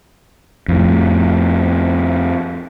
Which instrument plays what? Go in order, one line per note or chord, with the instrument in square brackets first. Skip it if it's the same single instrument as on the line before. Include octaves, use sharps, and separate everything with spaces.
[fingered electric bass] F2 A2